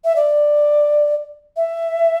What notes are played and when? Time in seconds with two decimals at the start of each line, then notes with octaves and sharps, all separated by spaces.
0.04 E5
0.16 D5
1.57 E5